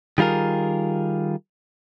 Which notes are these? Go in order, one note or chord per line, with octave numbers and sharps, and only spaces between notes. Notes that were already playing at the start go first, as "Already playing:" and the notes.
D#3 G3 F4 G#4 A#4